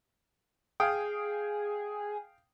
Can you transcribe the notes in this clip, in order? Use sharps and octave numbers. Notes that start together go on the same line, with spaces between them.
G#4 F5 G5 D#6